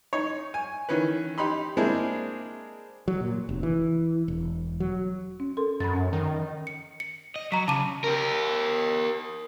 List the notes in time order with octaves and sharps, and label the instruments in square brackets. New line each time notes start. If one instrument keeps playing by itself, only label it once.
[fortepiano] D#4 C#5
G#5
D#3 E3 C#4 B4
D#4 G4 B5 C6
G#3 A#3 C4 D4 E4 G#4
[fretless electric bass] F#3
A#2
F1
E3
E1
F#3
[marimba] C#4
A4 A#4 C6
[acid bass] F#2 [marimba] B5 A6
[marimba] C#4
[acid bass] D#3
[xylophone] C#7
C#7
[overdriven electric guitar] D#5
[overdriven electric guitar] F#3 [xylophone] A#5 B6
[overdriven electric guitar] C#3 [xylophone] A5 D6 D#7
[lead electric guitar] G4 A#4